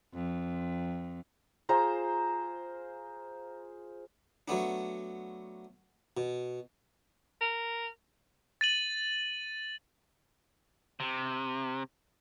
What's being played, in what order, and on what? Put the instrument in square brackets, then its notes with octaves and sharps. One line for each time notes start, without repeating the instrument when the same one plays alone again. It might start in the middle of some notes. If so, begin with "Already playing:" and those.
[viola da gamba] F2
[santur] F4 G#4 C5 A#5
[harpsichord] F#3 A3 B3 D4
B2
[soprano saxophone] A#4
[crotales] A6 D#7 F#7
[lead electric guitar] C3